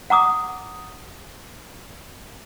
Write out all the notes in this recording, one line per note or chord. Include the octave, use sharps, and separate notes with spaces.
F#5 A#5 D6 D#6